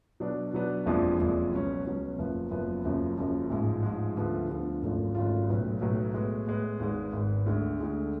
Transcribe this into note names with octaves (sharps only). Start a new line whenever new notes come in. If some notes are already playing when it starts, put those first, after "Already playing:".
B2 F#3 B3 D4
B2 F#3 B3 D4
F#1 F2 F3 G#3 D4
F#1 F2 F3 G#3 D4
C#2 B2 F#3 C#4
C#2 B2 F#3 C#4
F#1 F#2 F3 B3
F#1 F#2 F3 B3
F#1 F#2 C#3 F3
F#1 F#2 C#3 F3
A1 G#2 F3 G#3
A1 G#2 F3 G#3
D2 D3 F3 B3
D2 D3 F3 B3
G#1 F#2 F3 A3 F4
G#1 F#2 F3 A3 F4
B1 A2 F#3 B3
B1 A2 F#3 B3
A2 G#3 B3
A2 G#3 B3
G#1 G#2 G#3 B3
G#1 G#2 G#3 B3
D2 D3 G#3
D2 D3 G#3